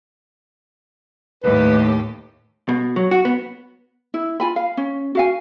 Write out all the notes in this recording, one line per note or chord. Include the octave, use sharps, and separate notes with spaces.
D#2 A2 G4 B4
B2
F#3
F#4
B3
E4
F4 G#5 B5
F5
C#4
F#4 F5 G#5